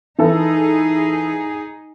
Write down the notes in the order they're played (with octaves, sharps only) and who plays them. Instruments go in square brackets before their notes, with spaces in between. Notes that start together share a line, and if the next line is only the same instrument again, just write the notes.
[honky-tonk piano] E3 A4 [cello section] D#4 G#4